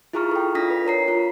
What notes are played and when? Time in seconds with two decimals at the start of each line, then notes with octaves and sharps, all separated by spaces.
0.13 E4 F4 G#4 A#5 C#6 F6
0.31 A4 G5
0.55 D4 F4 D#6 A#6 B6
0.70 B4
0.85 A#4 C#5 A#5 C7
1.08 F4